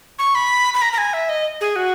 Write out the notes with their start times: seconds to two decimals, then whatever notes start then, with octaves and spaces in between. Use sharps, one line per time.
0.19 C#6
0.35 B5
0.74 B5
0.82 A#5
0.93 A#5
0.98 G#5
1.14 E5
1.29 D#5
1.61 G#4
1.76 F#4